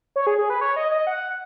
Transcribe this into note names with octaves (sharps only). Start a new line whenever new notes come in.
C#5
G#4
G#4
B4
C#5
D#5
D#5
F#5